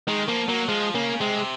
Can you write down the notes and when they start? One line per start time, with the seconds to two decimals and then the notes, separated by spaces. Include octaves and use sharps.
0.08 D#3 G#3
0.28 F3 A#3
0.48 F#3 A#3
0.69 F3 G#3
0.95 C#3 A#3
1.21 C3 G#3